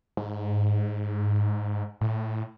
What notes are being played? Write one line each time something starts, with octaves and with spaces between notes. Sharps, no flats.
G#2
A2